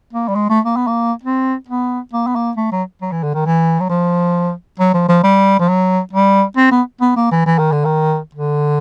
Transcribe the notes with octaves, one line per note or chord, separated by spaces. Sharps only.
A#3
G3
G#3
A3
A#3
B3
A#3
C4
B3
A#3
B3
A#3
A3
F#3
F#3
E3
D3
D#3
E3
F#3
F3
F#3
F3
F3
G3
F3
F#3
G3
C4
B3
B3
A#3
E3
E3
D#3
D3
D#3
D3